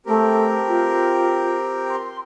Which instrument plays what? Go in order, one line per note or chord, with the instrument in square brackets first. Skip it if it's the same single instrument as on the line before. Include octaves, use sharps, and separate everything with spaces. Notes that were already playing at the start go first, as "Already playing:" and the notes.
[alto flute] A3 [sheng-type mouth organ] C4 G4 A#4
[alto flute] F4
C6